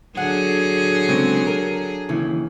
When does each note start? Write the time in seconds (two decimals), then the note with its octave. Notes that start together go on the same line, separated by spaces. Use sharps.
0.17 D3 F#3 G#4 F#5
1.09 C#3 G#3 C4
1.47 A#4
2.09 D#2 C#3 E3